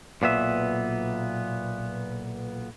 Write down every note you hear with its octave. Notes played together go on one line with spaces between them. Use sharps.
B1 A#2 B3 E5